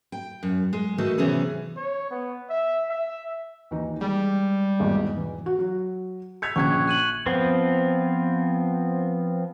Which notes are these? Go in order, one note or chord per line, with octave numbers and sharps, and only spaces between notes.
G5
F#2
G#3
D#3 E3 A3 D#4 F#4 A4
C3 E3 B3 C#4 G#4
C#5
B3
E5
E5
D#2 E3 D#4
G3 G#3
E2 G#2 B2
E3
F#4
F#3
E6 G#6 B6 C#7 F7
A#1 C#3 C#6 F#6 G#6
F#6 D#7 F#7
F3 B3 C4